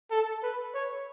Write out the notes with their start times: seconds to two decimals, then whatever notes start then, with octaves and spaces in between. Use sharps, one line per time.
0.11 A4
0.43 B4
0.74 C#5